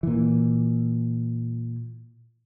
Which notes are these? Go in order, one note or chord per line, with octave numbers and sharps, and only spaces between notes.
A#2 E3